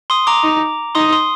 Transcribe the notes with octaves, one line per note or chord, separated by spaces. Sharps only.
C6 D#6
A#5 D6
D#4
D#4 C6 D#6
C6 D#6